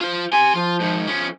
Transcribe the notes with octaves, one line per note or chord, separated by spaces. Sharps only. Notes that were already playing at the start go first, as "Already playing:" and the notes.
F4 C5
G4 G#5 C6
F3 F4
G#2 D#3
F3 C#4